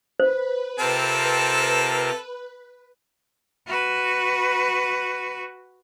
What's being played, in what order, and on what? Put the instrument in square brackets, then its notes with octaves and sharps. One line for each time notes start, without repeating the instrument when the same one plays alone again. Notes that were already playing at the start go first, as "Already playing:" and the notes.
[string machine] B4 [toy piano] C5
[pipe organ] C3 F4 A#4 [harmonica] C4 A4 A5
[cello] F#4 B4